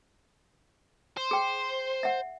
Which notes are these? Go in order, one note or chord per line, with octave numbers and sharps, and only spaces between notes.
C5
G#4 G5
E5 F#5